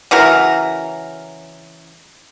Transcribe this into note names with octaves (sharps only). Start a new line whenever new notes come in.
C#3 E3 F#4 A#4